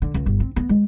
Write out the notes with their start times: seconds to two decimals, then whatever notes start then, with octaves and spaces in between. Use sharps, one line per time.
0.02 D3
0.14 C#2
0.26 G1
0.40 C4
0.56 B3
0.69 G#3